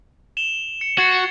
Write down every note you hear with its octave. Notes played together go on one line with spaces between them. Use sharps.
E7 F7 G7
C#7
F#4 G#6 A6 C7